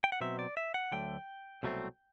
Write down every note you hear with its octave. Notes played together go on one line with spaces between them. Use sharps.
G5
F#5
B2 F#3 C4 E5
D5
E5
F#5
D2 D3 F#3 A3 G5
C2 B2 F#3 A3 C4